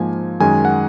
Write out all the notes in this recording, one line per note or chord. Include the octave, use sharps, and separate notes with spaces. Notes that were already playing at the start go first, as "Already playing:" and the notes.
Already playing: G#2 F3 A#3 G#5
F#2 D#3 G#3 G#5
F#5